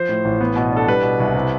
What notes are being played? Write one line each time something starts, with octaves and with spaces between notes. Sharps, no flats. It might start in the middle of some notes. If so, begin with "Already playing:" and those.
Already playing: F3 C5
A2
A1
B3
B2
D4 A4
G3 B4
B2
C2
C3